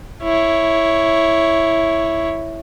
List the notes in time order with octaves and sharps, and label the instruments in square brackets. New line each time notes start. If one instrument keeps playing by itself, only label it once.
[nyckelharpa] E4 C#5